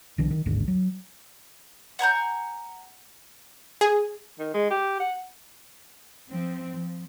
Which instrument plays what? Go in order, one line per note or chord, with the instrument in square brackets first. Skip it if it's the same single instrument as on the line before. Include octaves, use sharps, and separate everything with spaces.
[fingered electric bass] B1 D3 E3
D#3
A1 D#2 G#2 D3
F#3
[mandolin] F#5 G#5 A#5 G6
[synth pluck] G#4
[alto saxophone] D#3
G#3
G4
F#5
[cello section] F3 C4
F3